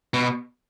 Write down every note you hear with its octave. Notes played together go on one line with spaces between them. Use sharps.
B2